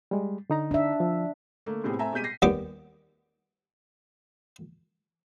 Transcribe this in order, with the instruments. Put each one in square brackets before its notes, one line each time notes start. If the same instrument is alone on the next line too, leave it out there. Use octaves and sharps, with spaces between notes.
[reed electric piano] G3 G#3
D3 D#4 A#5
[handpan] D4 E5
[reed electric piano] F3
[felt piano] D3 A3 A#3
A2 C3 G3 B3 C4 G#4
A3 C4 A4 E5 G#5 A#5
B2 G3 G#3 G6 B6 D#7
A#6 C7
[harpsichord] D#2 G3 B3 G4 D6